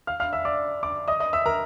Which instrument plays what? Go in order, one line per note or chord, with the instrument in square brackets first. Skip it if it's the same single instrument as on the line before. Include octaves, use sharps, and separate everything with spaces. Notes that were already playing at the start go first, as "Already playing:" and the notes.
[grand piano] F5 F6
F5 F6
E5 E6
D5 D6
D5 D6
D#5 D#6
D#5 D#6
E5 E6
A#4 A#5